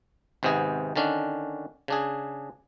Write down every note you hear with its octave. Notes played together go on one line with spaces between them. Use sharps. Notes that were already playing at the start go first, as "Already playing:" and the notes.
G#1 G#2 C3 B3 G#4
D3 D#3 C#4 D4
C#3 D4 G#4